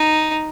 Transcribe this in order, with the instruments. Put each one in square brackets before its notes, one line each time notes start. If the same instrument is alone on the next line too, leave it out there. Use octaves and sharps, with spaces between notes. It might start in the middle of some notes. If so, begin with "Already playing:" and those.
Already playing: [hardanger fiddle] D#4